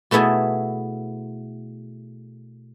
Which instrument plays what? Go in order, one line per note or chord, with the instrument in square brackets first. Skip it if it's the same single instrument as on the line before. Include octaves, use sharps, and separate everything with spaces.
[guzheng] B2 A3 B3 E4 G#4